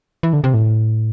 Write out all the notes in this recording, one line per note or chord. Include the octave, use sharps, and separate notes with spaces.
E3
D3
C3
A2